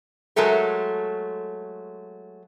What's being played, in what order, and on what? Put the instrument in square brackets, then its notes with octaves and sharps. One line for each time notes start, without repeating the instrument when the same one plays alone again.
[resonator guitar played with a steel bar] F#3 G#3 A3 A4 A#4